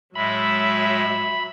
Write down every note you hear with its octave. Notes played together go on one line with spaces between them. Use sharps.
A2 F#3 G#3 E5 B5